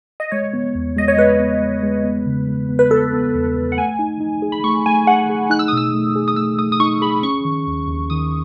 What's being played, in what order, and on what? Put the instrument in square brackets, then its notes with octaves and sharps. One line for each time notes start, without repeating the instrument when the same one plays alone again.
[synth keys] D#5
[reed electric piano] G#3 [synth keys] C#5
[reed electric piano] B3
E2
[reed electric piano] G#3 [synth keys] D#5
[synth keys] C#5
[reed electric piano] G#3 [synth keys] B4
[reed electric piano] B3
G#3
G#3
B3
C#3
G#3
B3
[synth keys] B4
[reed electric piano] B3 [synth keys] A4
[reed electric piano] B3
E2
E2
[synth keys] F#5
[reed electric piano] A3 [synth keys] G#5
[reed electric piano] D#4
D#4
G#4
[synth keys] B5
[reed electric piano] A3 [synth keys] C#6
[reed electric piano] A3 [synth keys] G#5
[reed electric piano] G#4 [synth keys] F#5
[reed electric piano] G#4
[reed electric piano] D#4 [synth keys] F#6
[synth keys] E6
D#6
[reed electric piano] B2 [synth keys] E6
[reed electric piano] A3
G#4
[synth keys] D#6
[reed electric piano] A3 [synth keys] E6
[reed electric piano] A3 [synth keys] D#6
[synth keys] D#6
[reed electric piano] D#4 [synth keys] C#6
[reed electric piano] G#4 [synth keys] B5
[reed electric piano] C#4 [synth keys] C#6
[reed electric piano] D#3
D#2
D#2
[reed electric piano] D#3 [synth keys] D#6